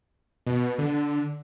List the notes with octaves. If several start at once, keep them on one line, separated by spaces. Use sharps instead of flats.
B2
D3